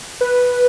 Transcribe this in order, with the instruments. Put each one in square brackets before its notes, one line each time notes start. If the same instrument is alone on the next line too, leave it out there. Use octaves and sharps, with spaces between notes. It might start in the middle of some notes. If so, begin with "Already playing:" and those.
[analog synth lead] B4